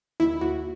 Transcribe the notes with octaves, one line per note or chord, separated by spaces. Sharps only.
D#2 E4
D#2 F#4